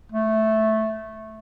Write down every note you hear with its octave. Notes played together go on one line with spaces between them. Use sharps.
A3